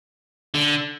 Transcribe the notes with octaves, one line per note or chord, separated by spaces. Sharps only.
D3